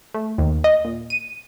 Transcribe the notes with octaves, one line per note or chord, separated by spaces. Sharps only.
A3
D#2
D#5
A#2
D#7